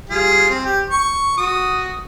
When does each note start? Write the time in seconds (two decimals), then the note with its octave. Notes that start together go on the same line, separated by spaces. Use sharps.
0.10 G3 F4 G#4
0.50 C4
0.65 G4
0.90 C#6
1.37 F#4 D#6